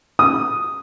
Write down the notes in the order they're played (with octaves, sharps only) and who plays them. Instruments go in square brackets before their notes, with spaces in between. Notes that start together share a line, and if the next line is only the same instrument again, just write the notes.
[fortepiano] D#6